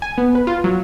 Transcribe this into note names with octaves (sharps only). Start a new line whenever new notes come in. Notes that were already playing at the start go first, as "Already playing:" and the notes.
G#5
B3
B4
F4
F#3